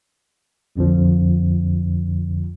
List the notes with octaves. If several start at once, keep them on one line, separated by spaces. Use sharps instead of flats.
A#1 F2 D3 F3